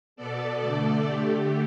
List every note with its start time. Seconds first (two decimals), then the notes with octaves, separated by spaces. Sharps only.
0.16 B2 B3 A4 D5
0.61 D3 A3
1.05 D3 A3 G4